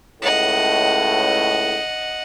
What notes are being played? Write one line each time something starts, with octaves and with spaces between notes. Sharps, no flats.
C#2 A2 D#5 F#5